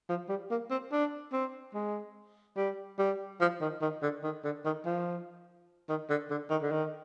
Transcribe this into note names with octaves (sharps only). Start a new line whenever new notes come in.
F3
G3
A#3
C4
D4
C4
G#3
G3
G3
F3
D#3
D#3
D3
D#3
D3
D#3
F3
D#3
D3
D3
D#3
D3
D#3